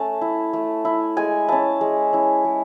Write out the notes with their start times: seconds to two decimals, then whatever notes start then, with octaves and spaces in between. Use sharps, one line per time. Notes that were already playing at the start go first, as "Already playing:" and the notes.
Already playing: A3 C#4 E5 A5
0.21 E4
0.53 A3
0.85 E4
1.17 G#3 G#5
1.48 C#4 E4 A5
1.81 G#3
2.13 C#4 E4
2.45 G#3